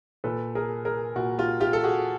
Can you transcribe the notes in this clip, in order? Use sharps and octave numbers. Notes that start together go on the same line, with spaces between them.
A#2 A4 B4
G#4 A#4
G#4 A#4
A#2 F#4
F4 G4
F4 G4
A4
F#4 G#4